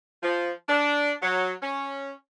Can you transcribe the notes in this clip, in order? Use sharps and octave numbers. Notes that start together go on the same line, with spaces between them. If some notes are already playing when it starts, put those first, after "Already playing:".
F3
D4
F#3
C#4